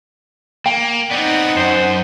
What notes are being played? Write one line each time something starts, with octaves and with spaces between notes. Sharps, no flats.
A#3 G5
B3 C4 D#4 D5 F#5
F#2 C5